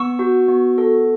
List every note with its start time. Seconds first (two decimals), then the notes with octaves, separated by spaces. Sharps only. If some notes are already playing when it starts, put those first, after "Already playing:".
Already playing: B3 C#6 E6
0.19 F#4
0.48 B3
0.78 A4